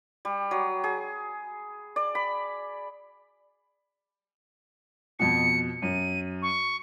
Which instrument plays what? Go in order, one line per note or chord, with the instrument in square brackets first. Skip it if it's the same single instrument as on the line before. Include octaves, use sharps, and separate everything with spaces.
[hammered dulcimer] G3
F#3
G#4
D5
B5
[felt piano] F2 B2 [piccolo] C#7
[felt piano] F#2 [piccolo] D#7
[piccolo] C#6